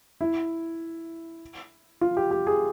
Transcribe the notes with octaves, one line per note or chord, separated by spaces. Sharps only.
E4
F4
G4
G4
G#4